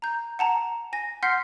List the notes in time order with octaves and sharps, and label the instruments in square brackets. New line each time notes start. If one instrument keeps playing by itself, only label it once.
[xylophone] A#5 G6
F#5 A5 A#5
G#5 A#6
F#5 C6 F6 G6 B6 C7